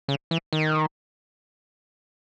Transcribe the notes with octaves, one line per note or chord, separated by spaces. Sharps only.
C#3
E3
D#3